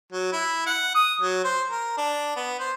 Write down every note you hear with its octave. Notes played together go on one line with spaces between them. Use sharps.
F#3
E4
F#5
D#6
F#3
C5
A#4
D4
B3
C5